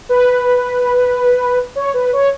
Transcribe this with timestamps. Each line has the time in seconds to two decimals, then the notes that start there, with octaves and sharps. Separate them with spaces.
0.09 B4
1.76 C#5
1.94 B4
2.13 C#5